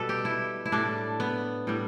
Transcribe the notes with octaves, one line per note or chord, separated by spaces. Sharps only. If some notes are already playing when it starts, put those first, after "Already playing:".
Already playing: B2 G3 A4 B4
G4
E4
E4
A2 G3 D4
B3
A2 G3